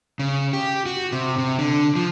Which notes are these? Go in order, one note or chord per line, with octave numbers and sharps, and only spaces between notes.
C#3
G4
F#4
C3
C3
D3
F3